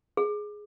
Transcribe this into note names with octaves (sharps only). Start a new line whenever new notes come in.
G#4